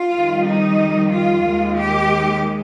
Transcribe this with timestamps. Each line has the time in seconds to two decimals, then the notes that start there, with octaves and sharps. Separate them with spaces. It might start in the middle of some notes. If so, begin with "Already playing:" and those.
Already playing: F4
0.12 F2 D#3 G3
0.45 D#4
1.10 F4
1.43 D#2 D#3 G#3
1.75 G4